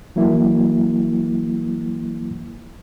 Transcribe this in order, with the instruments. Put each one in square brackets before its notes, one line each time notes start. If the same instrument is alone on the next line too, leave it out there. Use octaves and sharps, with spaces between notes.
[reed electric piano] E3 F#3 A#3 E4